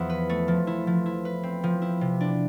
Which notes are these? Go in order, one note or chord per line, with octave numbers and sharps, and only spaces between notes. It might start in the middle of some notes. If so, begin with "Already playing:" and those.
Already playing: E2 F3 B3 E4
B4
A3
F3
E4
F3
E4
B4
C4
F3
E4
C3
D4